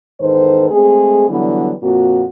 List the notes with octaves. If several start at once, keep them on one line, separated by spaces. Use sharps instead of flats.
E2 G#2 D#3 A4 B4 C5
G#3 A3 C4 G#4
D3 E3 F#3 G3 B3
F2 A#2 C4 F#4